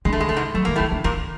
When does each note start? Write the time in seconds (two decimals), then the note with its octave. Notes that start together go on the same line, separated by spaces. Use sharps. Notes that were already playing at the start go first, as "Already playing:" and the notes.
0.05 D3 G#3
0.13 A3
0.20 G#3
0.29 C#3 A3
0.37 G#2 G#3
0.54 F#3 A3
0.65 E3 A#3
0.76 A2 A3
0.80 D#3
0.92 D3
1.04 A#2 D#3 A#3